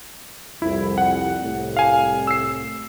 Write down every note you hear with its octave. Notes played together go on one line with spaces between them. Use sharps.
C2 F2 E4
F#5
C2 A2
F5 G#5
E6 C7